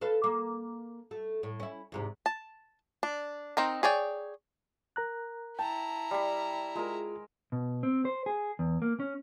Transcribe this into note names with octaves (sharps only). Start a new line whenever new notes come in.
A4 B4 F5
A#3
A3
A2
C#4 E4
E2 G#2 C3
A5
D4
C4 D#4 A#4
G#4 C#5 D5 G5
A#4 A#5 F#6
E4 G5 A5 A#5
G3 B5
G#3 F4 G#4 A#4
B2
C4
C5
G#4
E2
A#3
C#4